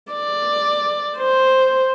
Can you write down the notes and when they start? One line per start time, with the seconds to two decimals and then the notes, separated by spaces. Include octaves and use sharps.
0.13 D5
1.17 C5